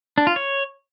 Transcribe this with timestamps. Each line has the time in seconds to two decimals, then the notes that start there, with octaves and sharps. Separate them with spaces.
0.18 D4
0.27 F4
0.36 C#5